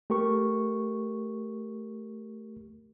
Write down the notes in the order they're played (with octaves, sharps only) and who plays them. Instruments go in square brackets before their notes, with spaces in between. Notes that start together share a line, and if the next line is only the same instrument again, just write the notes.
[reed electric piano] A3 G4 A#4 C#6